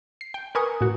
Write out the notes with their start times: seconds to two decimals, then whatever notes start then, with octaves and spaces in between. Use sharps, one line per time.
0.21 C7
0.34 G5
0.55 A#4 B4 G#5 C#6 D#6
0.81 A2 F#4